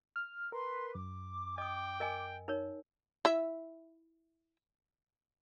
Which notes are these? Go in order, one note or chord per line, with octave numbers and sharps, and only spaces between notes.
F6
A#4 B4 C6
F#2 D6
D#5 G5 D#6
A#4 D#5 G#5
D#4 A#4 C#5
E4 E5